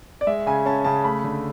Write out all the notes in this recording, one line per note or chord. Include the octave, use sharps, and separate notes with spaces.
D5
G#3 E5
C#3 G#5
C#4 A5
C#3 A5
A3 B5
D3